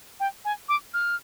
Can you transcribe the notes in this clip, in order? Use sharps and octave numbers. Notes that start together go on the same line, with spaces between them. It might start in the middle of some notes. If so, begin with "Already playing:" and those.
G5
G#5
D6
F6